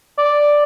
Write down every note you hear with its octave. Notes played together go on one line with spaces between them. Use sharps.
D5